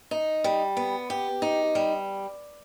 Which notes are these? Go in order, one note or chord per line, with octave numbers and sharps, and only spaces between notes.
D#4
G3
B3
G4
D#4
G3